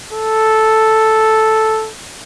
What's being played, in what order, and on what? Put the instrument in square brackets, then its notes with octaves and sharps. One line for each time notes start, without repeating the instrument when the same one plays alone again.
[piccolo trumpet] A4